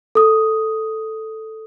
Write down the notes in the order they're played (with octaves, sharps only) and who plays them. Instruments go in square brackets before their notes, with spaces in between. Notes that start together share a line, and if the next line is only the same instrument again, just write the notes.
[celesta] A4 D#6